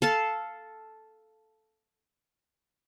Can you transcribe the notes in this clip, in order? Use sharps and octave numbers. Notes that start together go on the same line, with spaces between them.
A4 F5 A5